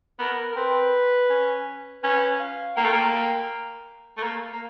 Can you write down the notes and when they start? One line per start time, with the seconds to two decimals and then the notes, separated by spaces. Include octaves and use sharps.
0.19 B3 A#4
0.52 A#4
0.56 C4 B4
1.29 C#4
2.03 C#4 B4
2.39 F5
2.76 A#3 G5
2.85 A3
2.92 A#3
3.13 G5
4.17 A3
4.23 A#3
4.53 A#3